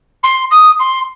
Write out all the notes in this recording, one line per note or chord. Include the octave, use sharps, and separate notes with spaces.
C6
D#6
C6